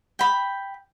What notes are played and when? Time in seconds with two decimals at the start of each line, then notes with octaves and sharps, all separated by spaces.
0.19 G5 B5